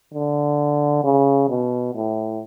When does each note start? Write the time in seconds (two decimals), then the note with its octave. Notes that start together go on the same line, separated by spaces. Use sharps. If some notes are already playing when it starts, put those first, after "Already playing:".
0.14 D3
1.04 C#3
1.49 B2
1.95 A2